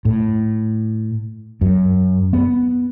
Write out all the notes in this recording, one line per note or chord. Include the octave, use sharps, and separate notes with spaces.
A2
F#2
B3